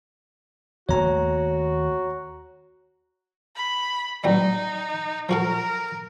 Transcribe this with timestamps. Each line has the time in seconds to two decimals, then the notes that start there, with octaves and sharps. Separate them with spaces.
0.89 D#2 A3 F#4 C#5 A#5
3.56 B5
4.24 A1 F#3 G3 D#4
5.29 F3 F#4 A4 A#4